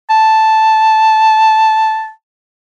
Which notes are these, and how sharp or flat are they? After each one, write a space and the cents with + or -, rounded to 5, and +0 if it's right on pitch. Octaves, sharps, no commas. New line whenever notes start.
A5 -5